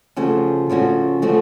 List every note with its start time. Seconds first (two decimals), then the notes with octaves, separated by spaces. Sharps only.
0.16 C#3 F3 A3 C#4 F#4
0.69 C#3 F3 A3 C#4 F#4
1.22 C#3 F3 A3 C#4 F#4